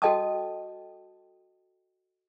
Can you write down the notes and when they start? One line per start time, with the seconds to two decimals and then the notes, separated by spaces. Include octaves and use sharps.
0.02 F#4 A4 D#5 G5 A5 D#6